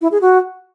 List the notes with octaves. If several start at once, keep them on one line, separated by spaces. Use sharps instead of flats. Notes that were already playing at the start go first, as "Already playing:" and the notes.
E4
G#4
F#4